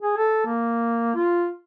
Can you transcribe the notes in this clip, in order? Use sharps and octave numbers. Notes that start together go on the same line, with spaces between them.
G#4
A4
A#3
F4